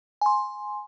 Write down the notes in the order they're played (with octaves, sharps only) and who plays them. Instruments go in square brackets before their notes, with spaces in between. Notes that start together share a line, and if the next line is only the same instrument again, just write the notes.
[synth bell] G#5 C6